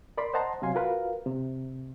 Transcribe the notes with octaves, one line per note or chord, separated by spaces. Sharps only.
A#4 D5 B5 C6
C5 D#5 F#5 A5 A#5 C6
C3 F#3 F5 G#5 C6
F4 F#4 A#4 B4 F5
C3